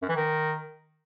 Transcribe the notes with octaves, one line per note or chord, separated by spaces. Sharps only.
F#2
E3
D#3